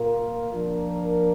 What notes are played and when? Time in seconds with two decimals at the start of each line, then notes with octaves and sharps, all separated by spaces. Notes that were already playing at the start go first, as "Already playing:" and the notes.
Already playing: A#2 A#3 F4 A#4
0.53 F3 A#3 D4 A#4